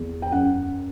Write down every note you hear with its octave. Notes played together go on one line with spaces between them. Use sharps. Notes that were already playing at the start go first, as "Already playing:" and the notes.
Already playing: E2
G5
F#2 F#5